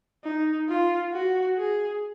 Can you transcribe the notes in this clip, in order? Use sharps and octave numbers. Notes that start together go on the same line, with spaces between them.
D#4
F4
F#4
G#4